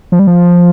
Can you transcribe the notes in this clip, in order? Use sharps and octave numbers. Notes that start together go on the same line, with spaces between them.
F3
G3
F3